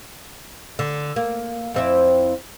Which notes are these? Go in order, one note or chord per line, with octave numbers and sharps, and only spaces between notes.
D3
A#3
F2 C4 E4